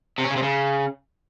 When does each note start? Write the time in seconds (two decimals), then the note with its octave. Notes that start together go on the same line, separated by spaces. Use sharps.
0.18 C3
0.24 C#4
0.30 C#3
0.36 C3
0.42 C#3